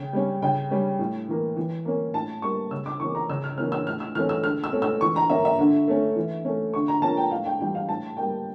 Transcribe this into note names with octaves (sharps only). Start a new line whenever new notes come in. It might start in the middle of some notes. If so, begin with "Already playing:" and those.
Already playing: C#3 G5
G3 C#4
C#3 G5
G3 C#4
A2
E3 A#3
E3
A#3 C#4
A2 A5
G3 A#3 C#6
C#3 E6
D6
E3 A#3 C#4 C#6
A#5
C#3 E6
F6
E3 A#3 C#4 F6
E6
A2 F6
E6
E3 A3 C#4 F6
E6
D3 F6
E6
A3 C#4
E6
E3 C#6
A#5
A#3 C#4 E5
E5
D3
A3 C#4
E3
A3 C#4
D3 C#6
A#5
F3 A#3 C#4 A5
G5
A2 F5
G5
E3 G3 G5
F5
A2 A5
G3 A#3 G5